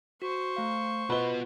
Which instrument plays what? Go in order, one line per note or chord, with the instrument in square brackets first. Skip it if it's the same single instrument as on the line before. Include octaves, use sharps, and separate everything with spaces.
[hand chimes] F#4 [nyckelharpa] C5 C#6
[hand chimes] A3 F5
[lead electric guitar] B3 F#4 [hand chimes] F4 [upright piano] B4 D#5 G7